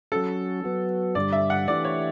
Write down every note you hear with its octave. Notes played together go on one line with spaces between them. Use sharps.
F#3 C#4 F#4 A4
F#3 B3 F#4
G2 D3 G3 D5
E5
F#5
E3 A3 D4 G4 D5
C#5